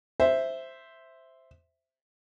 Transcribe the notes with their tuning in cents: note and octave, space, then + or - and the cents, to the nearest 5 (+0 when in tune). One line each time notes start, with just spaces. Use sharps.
C5 +0 E5 +0